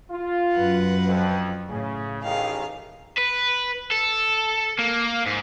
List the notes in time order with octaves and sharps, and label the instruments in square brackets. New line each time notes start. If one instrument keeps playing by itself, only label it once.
[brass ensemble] F4
[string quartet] F#2 B4 F#5
[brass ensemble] F2
[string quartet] A2 [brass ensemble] C#3
[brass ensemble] A1 D#3 [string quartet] G#4 F5
[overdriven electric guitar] B4
A4
A#3
G#2